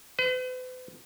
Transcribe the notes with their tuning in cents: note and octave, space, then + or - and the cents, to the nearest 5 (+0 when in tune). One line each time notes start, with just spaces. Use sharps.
B4 +45